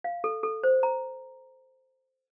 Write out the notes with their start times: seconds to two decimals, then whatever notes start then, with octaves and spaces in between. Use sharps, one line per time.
0.04 F5
0.24 A4
0.43 A4
0.63 C5
0.83 A#5